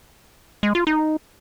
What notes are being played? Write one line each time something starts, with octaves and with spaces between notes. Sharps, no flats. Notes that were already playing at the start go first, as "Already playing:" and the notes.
G#3
F4
D#4